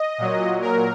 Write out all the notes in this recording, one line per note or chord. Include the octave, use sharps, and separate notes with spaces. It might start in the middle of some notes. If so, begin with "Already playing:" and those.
Already playing: D#5
A#2 F#3
A#4